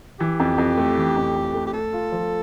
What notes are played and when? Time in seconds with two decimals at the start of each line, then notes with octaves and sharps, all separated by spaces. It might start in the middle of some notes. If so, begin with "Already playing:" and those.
0.20 E3 G4
0.40 F2
0.58 F2
0.78 A3
0.98 E3
1.16 F2
1.36 F2
1.54 A3
1.67 G4
1.73 A3 A4
1.93 F4
2.12 F3